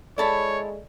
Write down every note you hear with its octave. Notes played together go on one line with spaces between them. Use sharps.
G#3 E4 A4 C#5 D5 E5 A5 B5